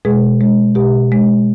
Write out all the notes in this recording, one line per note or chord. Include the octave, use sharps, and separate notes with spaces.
B2 G#3 G#4
G#3
B2 G4
G#3